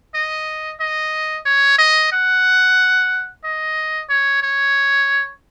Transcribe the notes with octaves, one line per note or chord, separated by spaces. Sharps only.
D#5
D#5
C#5
D#5
F#5
D#5
C#5
C#5